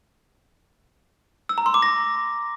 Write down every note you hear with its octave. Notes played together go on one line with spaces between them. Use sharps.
E6
A#5
C6
D6
A#6